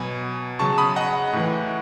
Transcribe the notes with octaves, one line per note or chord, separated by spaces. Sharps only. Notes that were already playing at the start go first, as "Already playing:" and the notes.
Already playing: B2 F#3 G#5 B5
C#3 F#3 A5 C#6
B5 D#6
D#5 F#5
A2 E3